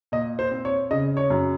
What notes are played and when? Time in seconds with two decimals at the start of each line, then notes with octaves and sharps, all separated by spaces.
0.12 A#2 D#5
0.39 C5
0.51 C4
0.65 C#5
0.91 C#3 D#5
1.17 C#5
1.30 F#2